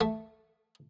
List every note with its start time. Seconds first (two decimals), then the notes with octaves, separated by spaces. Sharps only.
0.01 A3